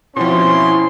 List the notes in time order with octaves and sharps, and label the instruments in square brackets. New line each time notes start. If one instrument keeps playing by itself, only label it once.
[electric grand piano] B2 F3 [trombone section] C4 C#4 [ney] E4 [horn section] C6